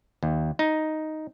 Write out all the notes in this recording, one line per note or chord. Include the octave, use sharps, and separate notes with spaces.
D#2
D#4